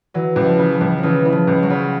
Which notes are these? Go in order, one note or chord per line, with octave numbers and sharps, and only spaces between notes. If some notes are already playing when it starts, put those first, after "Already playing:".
E3 F#3
C#2
F3
C#3
F3
C#2
F3
C#3 E3
C#3 E3
F3
C#2
F#3
C#3